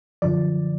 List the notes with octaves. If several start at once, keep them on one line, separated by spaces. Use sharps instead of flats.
F#2 D3 F3 D5